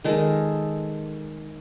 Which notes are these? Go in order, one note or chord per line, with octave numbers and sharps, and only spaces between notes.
D#3 G#3 A4